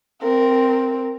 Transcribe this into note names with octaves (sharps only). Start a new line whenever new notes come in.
C4 A#4